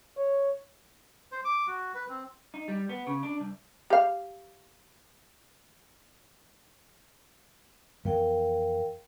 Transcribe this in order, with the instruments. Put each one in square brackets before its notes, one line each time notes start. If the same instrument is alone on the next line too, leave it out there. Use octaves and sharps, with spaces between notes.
[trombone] C#5
[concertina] C5
D6
F#4
B4
C4
[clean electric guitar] D#4
G3
B3
C#3
D4
C2
[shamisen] G4 F5
[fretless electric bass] F2 E3 B3 [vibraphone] A#4 F5 G5